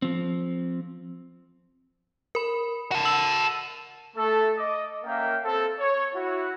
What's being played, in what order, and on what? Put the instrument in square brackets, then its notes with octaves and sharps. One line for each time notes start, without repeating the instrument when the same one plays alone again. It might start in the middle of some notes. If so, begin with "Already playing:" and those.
[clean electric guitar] F3 C4
[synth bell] A#4 B5
[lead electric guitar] F#4 A4
[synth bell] E6 F#7
[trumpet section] A3 A4
D#5 D6
A#3 C#4 A#4 E5 F5 G5
C4 A4
C#5
E4 F#4